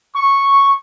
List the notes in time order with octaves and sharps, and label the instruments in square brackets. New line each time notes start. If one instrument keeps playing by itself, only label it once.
[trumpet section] C#6